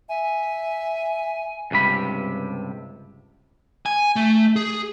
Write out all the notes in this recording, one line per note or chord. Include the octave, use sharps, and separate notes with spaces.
E5 G#5
C#2 G2 C3 B5
G#5
A3
G#4